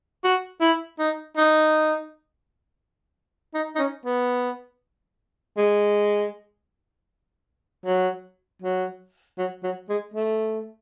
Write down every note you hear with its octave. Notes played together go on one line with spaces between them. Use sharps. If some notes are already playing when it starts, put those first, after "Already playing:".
F#4
E4
D#4
D#4
D#4
D#4
C#4
B3
G#3
F#3
F#3
F#3
F#3
G#3
A3